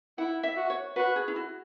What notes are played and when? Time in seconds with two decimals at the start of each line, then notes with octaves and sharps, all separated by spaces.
0.18 E4 F#5
0.43 E5
0.57 F#4
0.70 C#5
0.96 F#4 B4
1.16 G#4
1.28 E4
1.36 F#4